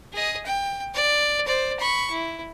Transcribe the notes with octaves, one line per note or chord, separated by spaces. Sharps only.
G#4 D#5
G5
D5
C5 D5
B5 C#6
E4